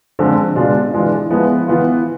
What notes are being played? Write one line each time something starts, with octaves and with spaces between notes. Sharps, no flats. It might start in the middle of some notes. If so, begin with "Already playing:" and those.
D3 F3 G#3 C4
B2 G#3 D4 F4
E3 G#3 D4 F4
F3 G#3 B3 E4
E3 B3 F4